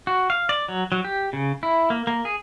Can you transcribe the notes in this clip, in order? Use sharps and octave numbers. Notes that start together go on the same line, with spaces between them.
F#4
F5
D5
F#3
F#3
G4
C#3
E4
A#3
A#3
G#4